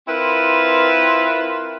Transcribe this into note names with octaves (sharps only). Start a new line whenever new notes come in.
C4 E4 F4 A#4 B4